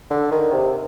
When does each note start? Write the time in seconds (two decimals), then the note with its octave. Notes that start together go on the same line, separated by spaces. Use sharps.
0.11 D3
0.31 D#3
0.52 C3